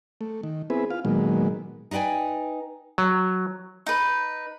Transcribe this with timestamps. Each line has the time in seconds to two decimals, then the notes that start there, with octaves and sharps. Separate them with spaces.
0.21 A3
0.43 D#3
0.70 B3 C4 E4 G#4 B4
0.90 F4 F5
1.05 A#2 D#3 F#3 G#3 B3
1.91 D#4 B4 D5 G5 G#5
2.98 F#3
3.86 D#4 B4